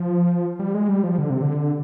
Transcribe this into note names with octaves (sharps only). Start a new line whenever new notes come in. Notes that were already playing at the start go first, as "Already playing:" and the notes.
Already playing: F3
G3
G#3
G3
F3
D3
C3
D3